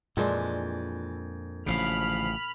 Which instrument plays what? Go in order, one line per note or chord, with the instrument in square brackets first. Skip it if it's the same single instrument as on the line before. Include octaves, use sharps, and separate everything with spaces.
[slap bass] F2 [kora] A#2 G#3 D4 [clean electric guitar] E3
[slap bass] A1 C#3 [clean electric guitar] D2 F3 F5 [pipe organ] B5 F6